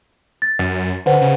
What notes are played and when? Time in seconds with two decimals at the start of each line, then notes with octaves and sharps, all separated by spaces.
0.42 A6
0.59 F#2
1.06 D3 B4 C5 F#5
1.21 C#3